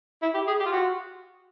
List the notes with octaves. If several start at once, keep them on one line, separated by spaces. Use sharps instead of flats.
E4
G4
G#4
G4
F4
F#4